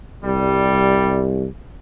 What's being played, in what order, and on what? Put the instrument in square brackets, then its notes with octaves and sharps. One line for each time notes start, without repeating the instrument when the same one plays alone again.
[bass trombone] C2 [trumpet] G3